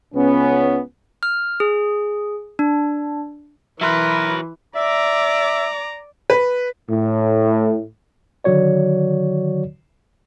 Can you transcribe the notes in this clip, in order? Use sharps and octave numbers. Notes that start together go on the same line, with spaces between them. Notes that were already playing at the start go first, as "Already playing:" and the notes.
C#2 B3 C#4
F6
G#4
D4
E3 F#3 A#4 B4 E5 C6 F#6
D5 E5 A#5 D6
B4
A2
D3 D#3 F#3 F#4 C#5 D5